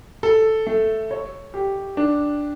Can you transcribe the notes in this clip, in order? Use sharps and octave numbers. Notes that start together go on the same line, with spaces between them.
A4
A3
C#5
G4
D4